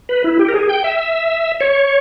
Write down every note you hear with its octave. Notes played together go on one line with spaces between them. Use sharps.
B4
E4
G4
A#4
G#4
G5
E5
C#5